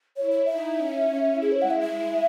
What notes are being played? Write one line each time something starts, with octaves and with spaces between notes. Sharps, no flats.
E4 C#5
C#5
D#4 E5
C#4
C#4
E4
G#4
C#5
G#3 F#5
E5
E5